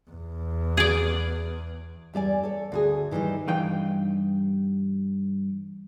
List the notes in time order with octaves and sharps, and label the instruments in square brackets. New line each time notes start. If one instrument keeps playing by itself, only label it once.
[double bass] E2
[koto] G#4 D5
[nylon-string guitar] E2 G3 D5 G#5
A4 C#5
D2 F#4 G#4
D#3 E3 G3 B3 D#4
[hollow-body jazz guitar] G2 E3 D#4 F4 G5